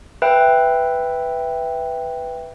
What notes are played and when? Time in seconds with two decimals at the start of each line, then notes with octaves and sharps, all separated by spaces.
0.22 B4 E5 G5